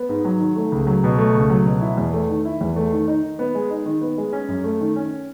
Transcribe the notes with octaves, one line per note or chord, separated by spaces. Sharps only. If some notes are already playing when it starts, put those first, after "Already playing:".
Already playing: B3
G#2
F#3
D#3
A3
C#2
F#3
B2
A3
C#2
F#3
B2
E4
E2
A3
D#3
E4
E2
A3
D#3
D#4
D#3
B3
G#3
D#4
D#3
B3
G#3
C#4
F#2
A3
D#3
C#4